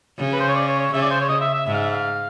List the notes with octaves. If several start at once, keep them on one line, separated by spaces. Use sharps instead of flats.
C#3
B4
C5
C#5
D5
C#5
C#5
C#3 E5
D5
C5
C#5
D#5
E5
E5
G#2 E5
F5
E5
F5